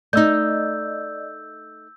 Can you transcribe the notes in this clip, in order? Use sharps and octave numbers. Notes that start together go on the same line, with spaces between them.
A3 D#4 D5 D#5 E6 G6